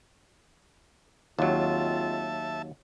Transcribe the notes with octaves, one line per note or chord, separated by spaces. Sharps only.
D#2 F#3 G#3 C4 F4 E5 A5